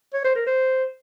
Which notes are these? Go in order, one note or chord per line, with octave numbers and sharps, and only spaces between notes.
C#5
C5
A#4
C5